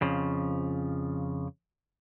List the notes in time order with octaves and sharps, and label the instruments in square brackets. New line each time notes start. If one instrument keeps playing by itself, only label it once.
[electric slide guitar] F2 C#3 F3